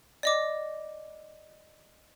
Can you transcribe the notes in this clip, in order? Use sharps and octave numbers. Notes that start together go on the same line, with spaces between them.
D5 D#5 D6